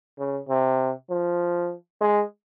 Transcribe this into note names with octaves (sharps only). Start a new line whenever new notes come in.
C#3
C3
F3
G#3